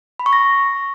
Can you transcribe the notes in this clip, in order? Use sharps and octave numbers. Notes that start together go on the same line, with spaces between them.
B5
C#6
A#6